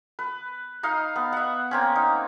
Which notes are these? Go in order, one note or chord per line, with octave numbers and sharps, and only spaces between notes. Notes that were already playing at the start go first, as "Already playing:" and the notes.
B4
D#4 D#5 F5
B3
E5 F#5
A#3 C4 C#4
D#4